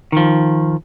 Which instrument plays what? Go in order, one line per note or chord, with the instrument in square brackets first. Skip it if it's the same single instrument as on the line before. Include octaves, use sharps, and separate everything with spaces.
[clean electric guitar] D#3 F3